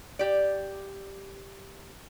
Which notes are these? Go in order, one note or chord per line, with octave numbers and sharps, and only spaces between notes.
G4 D5